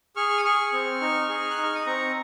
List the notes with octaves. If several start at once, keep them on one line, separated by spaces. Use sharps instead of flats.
G#4 C#6 F6
C#6
D#6
G#4 C#6 F6
C4
D#4
G#4
F#6
D#4
F6
D#6
C4 A#5 C#6